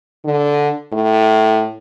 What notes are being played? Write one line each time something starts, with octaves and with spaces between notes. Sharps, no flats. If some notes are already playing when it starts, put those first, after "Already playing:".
D3
A2